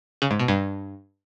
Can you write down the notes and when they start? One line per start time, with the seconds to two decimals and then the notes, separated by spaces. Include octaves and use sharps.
0.22 C#3
0.31 G#2
0.40 B2
0.48 G2